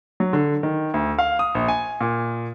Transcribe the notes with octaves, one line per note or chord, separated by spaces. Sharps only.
F#3
D3
D#3
D2
F5
D#6
A#1
G#5
A#2